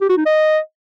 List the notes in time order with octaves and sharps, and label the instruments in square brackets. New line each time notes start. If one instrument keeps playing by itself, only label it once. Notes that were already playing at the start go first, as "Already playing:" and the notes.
[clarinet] G4
F#4
D#4
D#5